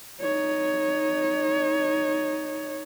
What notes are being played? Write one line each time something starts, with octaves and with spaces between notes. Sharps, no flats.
D#4 C#5